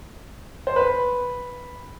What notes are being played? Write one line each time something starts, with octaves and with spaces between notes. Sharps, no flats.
C5
B4